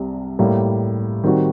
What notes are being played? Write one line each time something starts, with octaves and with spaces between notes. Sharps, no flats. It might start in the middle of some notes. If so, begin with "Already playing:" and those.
Already playing: C2 C3 G3
A2 G3 A#3
D#3 G3 C4 F#4